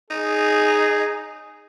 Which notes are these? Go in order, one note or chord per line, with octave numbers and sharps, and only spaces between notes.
D#4 G#4